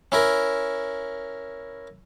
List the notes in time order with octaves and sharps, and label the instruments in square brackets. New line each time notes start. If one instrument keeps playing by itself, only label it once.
[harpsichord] C#4 E4 A#4